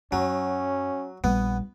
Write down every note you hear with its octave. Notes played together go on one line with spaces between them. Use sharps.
F#2 F#3 C#4
A#1 G3 B3